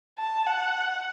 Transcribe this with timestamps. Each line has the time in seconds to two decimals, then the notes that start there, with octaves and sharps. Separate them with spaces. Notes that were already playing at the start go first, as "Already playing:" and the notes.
0.19 A5
0.47 F#5